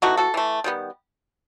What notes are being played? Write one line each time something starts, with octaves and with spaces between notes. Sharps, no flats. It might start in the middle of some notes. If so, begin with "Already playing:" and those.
E3 A3 D#4 F#4
F#4 A4
E3 A3
D#3 G3 B3